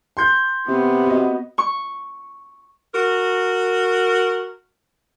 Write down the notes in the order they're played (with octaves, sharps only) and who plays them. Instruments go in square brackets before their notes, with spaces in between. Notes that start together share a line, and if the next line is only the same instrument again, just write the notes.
[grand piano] C6 G6
[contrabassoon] C3 [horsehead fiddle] B3
[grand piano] F#4 D#5
[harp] C#6
[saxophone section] F#4 A#4